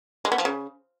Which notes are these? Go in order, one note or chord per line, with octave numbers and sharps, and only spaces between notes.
G#3
B3
F3
C#3